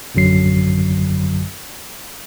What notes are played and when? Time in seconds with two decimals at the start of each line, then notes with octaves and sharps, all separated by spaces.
0.15 A1 F#2 D3 F#3 C7